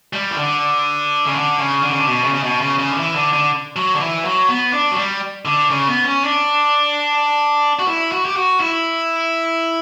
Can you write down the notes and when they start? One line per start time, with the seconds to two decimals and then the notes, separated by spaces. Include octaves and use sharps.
0.13 G3
0.31 E3
0.37 D3
1.26 C#3
1.34 D3
1.58 C#3
1.82 D3
1.90 C#3
1.97 D3
2.07 B2
2.24 C#3
2.34 C#3
2.43 B2
2.61 C#3
2.79 C#3
2.90 D3
2.98 E3
3.16 D3
3.33 D3
3.76 F#3
3.95 D3
4.00 E3
4.25 F#3
4.49 B3
4.73 D4
4.91 F#3
4.97 G3
5.45 D3
5.70 C#3
5.88 B3
6.06 C#4
6.24 D4
7.79 F#4
7.88 E4
8.12 F#4
8.25 G4
8.36 F#4
8.60 E4